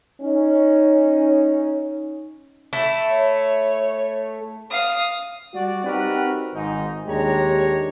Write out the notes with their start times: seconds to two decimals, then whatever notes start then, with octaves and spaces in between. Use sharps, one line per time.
0.21 C#4 D#4
2.73 A3 E4
3.10 C#5
4.71 F5 D#6
5.54 G3 F#4 D5
5.84 C4 D#4 F#4 G4 A#4 B4
6.54 G#1 G#2 D#4
7.07 D#2 G#3 D4 G4 C#5 A#5